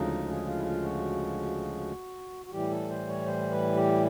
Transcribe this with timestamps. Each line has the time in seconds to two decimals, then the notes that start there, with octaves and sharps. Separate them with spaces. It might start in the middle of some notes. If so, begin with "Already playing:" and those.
Already playing: D2 C#3 F3 G#3 D#4
0.28 G#4
0.46 F4
0.56 E4
0.65 F4
0.84 F#4
2.46 F#4
2.52 A2 E3 G3 G4
2.70 A4
2.89 C5
3.08 C#5
3.26 C5
3.52 B4
3.76 G4